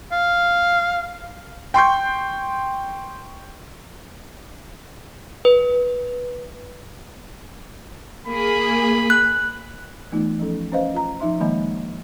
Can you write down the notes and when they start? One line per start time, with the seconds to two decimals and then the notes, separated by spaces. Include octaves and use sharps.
0.12 F5
1.74 G5 C6 C#6 G6
5.45 B4
8.27 A#3 G#4 B5
9.10 F#6
10.12 E3 A3 B3 D#4 F4
10.39 F3 C#4 A4
10.72 C#4 B4 C5 D#5 F5
10.94 F4 A#5
11.20 F3 D#4 E5 C6
11.40 D#3 F3 G#3 A#3 D#5 B5